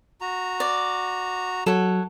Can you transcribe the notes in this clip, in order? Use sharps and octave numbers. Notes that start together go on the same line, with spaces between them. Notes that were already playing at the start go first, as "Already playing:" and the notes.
F#4 A#5
D5
F#3 A4 C#5 F#5